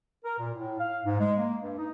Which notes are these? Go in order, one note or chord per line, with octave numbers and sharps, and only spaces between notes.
A#4
A#2
A2
F5
G#2
G#3
A#3
G2
D#4